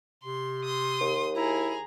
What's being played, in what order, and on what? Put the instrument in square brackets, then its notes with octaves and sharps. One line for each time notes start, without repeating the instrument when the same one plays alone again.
[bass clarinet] C3 [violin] C6
[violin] C6 D#6
[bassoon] D#2
[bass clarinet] E4 [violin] G#4 A#5